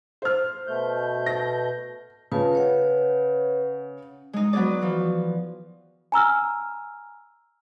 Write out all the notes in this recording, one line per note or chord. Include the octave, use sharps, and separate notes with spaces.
C5 F6
B2 A3 G6
A#6
C#3 F4 B4 A5
B4 C#5 F#5
G#3 D#4
F#3 B3 D#4 G#4 D5
E3 F3
G#5 A#5 E6 F6